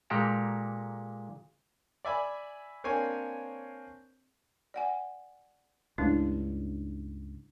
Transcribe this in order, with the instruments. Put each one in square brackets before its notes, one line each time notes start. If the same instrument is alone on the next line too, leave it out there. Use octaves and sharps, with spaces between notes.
[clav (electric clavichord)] A#2 G#3 A#3 G4 A4 A#5
[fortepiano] D5 E5 G#5 B5
A#3 C4 D4 C#5 G#5
[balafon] D5 F#5 G#5
[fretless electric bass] C#2 G2 [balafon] A3 D4 E4